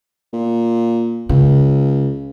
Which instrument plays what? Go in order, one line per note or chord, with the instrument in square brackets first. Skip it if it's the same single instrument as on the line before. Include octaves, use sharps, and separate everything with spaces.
[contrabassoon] A#2
[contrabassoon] C#2 [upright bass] C#3